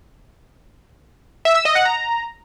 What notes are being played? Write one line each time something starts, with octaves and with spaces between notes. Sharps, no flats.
E5
E6
D#5
F#5
A#5